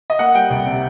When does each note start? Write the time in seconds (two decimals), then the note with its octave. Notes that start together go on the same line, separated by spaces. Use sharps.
0.10 D#5
0.19 A#3 F#5
0.34 G3 G5
0.50 C2
0.66 C3